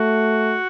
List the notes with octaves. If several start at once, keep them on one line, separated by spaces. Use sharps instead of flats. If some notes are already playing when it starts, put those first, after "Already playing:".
Already playing: A3 F#4